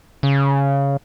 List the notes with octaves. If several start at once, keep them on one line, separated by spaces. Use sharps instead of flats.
C#3